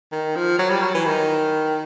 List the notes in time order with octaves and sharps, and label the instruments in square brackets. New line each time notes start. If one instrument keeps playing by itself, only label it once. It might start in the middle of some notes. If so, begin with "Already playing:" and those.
[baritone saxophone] D#3
F3
F#3
G3
F#3
E3
D#3